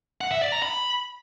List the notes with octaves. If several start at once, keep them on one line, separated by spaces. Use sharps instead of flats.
F#5
E5
D5
A#5
B5